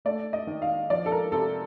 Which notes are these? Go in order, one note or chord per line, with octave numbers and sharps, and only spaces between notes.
A3 D5
D#5
D#3
F5
F3 D5
A4
A#4
C3 A4